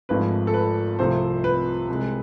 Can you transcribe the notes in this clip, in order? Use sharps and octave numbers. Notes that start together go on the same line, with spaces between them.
G#1 G#2 F3 A3 B4
A4
B4
C2 C3 F3 A3 C5
B4
C2 C3 G#3